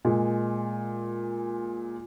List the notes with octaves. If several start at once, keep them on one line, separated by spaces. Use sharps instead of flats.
A#2 G#3